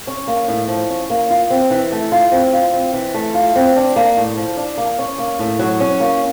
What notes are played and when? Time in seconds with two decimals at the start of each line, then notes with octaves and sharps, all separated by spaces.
0.07 C#4
0.28 A#3
0.48 A2
0.68 F3
0.89 C#4
1.10 A#3
1.30 F4
1.50 C4
1.71 E3
1.92 A3
2.12 F4
2.32 C4
2.53 F4
2.73 C4
2.93 E3
3.14 A3
3.34 F4
3.56 C4
3.76 D4
3.96 A#3
4.17 A2
4.37 F3
4.57 D4
4.77 A#3
4.99 C#4
5.18 A#3
5.39 A2
5.59 F#3
5.80 C#4
6.00 A#3